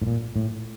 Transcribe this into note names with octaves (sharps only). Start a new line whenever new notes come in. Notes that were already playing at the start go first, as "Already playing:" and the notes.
A2
A#2
A2